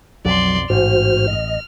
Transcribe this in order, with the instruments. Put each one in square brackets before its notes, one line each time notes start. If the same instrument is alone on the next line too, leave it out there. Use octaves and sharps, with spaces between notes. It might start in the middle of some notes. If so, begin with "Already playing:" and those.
[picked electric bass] B1 F2 [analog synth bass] F#3 [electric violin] D5 C6
[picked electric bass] A1 [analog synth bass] G#2 [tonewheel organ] F#4 C5 [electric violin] F6
[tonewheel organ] D#5